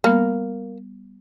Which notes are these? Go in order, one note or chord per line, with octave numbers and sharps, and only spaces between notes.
G3 A#3 B3